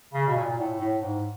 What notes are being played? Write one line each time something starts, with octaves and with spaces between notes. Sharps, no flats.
C#3
B2
A#2
A#2
A2
A2
G#2